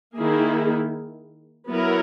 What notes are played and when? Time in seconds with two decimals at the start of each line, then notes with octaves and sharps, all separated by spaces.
0.17 D#3 A#3 E4 G#4
1.69 F#3 B3 E4 A#4